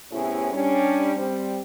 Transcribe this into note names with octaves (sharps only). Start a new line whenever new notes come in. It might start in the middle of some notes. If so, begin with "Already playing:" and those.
A2 C3 B3 C#4 E4 G#4
G3 C#4 D4
G3 C4